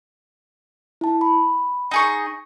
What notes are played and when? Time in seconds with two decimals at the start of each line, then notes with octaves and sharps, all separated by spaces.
1.01 E4 A5
1.21 B5
1.91 D#4 G#4 C#6 A#6